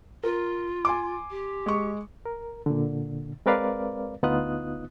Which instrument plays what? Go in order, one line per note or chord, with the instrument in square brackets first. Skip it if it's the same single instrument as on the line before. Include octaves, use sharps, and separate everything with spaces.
[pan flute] F4 [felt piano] A#4
[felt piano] G#5 C6 D6
[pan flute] G4
[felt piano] G#3 C#6
[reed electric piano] A#4
A#2 D3
G#3 C4 A#4 B4 D5 F5
D2 B3 D#4 F4 D#6 F#6